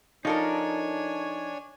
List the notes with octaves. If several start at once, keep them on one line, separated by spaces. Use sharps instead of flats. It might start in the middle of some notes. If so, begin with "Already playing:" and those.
F3 D4 D#4 A4 A#4 C#5 G#5